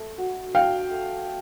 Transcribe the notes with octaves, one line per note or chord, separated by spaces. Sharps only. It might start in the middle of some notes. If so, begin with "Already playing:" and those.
Already playing: A3
F#4
D4 F5 G5
A3
A3